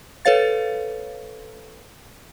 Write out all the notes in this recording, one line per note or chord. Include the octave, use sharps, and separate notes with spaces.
A4 B4 C#5 F5 A6